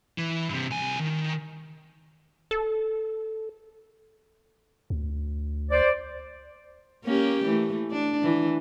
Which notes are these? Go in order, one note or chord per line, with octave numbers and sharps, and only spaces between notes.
E3
G2 C3
C2 G#5
D#3
A4
D2
C5 D5
A#3 C#4 G4
E3 A3
D4
E3